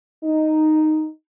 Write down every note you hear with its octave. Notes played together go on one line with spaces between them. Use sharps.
D#4